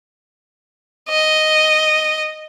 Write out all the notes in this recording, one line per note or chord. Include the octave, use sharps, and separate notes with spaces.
D#5